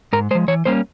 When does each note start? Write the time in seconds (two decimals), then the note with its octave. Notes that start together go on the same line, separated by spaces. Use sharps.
0.13 G#2 A#4
0.31 G#3 C5
0.35 F3
0.48 E3 C#5
0.65 G3 A#3 C#4 C5